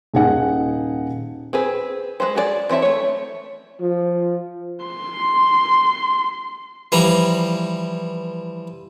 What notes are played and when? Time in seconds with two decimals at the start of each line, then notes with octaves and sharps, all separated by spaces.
0.14 D#1 D#4 G#4 F#5
1.53 C4 G#4 B4
2.20 G#3 B3 B4 C5
2.35 F#4 G#4 A#4 D5
2.69 E3 C4 C#5 E5 A5
2.82 A3 C#5
3.80 F3
4.85 C6
6.92 E3 F3 G3 A#5